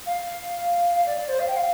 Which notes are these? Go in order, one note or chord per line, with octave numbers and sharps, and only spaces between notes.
F5
F5
D5
D5
C5
F5
G5
F5